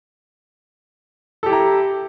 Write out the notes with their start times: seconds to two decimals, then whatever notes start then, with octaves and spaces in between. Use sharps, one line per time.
1.43 A4
1.46 G4
1.49 E4
1.53 A#5